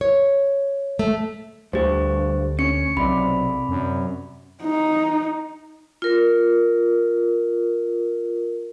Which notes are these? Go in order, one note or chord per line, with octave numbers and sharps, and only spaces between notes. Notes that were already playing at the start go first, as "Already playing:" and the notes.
C#5
A3
D2 G2 G4 C5
C#4 C#7
B1 C3 D5 B5
F#2
D#4
F4 A#4